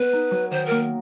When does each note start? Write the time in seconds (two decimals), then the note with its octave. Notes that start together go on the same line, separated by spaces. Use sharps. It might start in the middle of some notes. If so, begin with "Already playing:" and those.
Already playing: B3 B4
0.13 D#4
0.31 F#3
0.51 D#3 C5
0.66 A#3 A#4